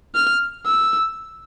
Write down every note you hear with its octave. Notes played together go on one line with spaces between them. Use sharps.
F6
E6